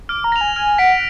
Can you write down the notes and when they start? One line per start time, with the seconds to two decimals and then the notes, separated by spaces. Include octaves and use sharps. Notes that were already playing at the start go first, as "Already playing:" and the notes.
0.09 D6 F6
0.24 A#5
0.32 A#6 F7
0.41 G#5
0.56 G#5 F6
0.78 F#5 B6 D7